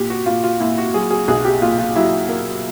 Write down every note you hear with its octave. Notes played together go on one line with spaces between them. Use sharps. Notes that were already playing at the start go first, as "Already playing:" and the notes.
Already playing: A#2 G4
F#4
A#2 F4
F4
A#2 E4
F#4
F#3 G#4
G#4
B1 G#4
G4
A#2 F4
F4
F#3 E4
A#3